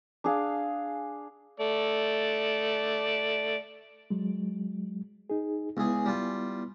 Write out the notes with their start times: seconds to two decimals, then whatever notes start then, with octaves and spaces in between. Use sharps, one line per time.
0.24 D4 G#4 F5
1.60 A3 D5
4.10 F#3 G#3
5.30 D#4 G#4
5.77 C#2 B3 E4 G#4
6.06 G3 F4